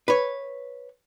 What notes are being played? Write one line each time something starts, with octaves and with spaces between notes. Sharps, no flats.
B4 C#5